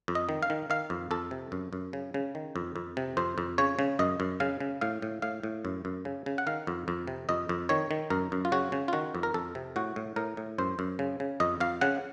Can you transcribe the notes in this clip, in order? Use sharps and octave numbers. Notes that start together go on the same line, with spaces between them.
F2
D#5
D#3
F5
D#3
D#3 F5
F2
F2 A4
C3
F#2
F#2
C#3
C#3
D#3
F2
F2
C3
F2 C5
F2
C#3 C#5
C#3
F#2 D#5
F#2
C#3 F5
C#3
A2 F5
A2
A2 F5
A2
F#2
F#2
C#3
C#3
F#5
D#3 F5
F2
F2
C3
F2 D#5
F2
D#3 C#5
D#3
F#2 A#4
F#2
F4
C#3 F#4
C#3
F4
D#3 F#4
F2
A#4
F2 A4
C3
A2 F#4
A2
A2 A#4
A2
F#2 C5
F#2
C#3
C#3
F2 D#5
F2 F5
C#3 F#5